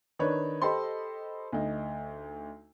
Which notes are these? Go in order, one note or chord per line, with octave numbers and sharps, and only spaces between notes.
D#3 D4 B4 C#5
G4 A4 C5 D#5 B5 C6
D2 D#4